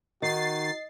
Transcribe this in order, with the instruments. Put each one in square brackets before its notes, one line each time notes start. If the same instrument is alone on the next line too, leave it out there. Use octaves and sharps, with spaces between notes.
[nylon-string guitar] D#3 [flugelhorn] F#4 [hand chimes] D#5 [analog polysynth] A6 C7